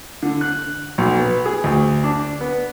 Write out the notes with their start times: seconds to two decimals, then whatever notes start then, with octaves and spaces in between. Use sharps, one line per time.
0.23 D3
0.41 F#6
0.98 B1
1.19 B3
1.46 G#4
1.64 D2
2.04 D4
2.41 B3